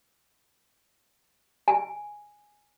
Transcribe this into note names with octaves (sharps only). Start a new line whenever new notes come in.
G#5